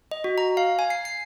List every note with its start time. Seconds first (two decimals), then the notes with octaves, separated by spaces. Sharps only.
0.11 D#5
0.24 F#4
0.38 A#5
0.57 F5
0.79 G#5
0.90 C7
1.05 C7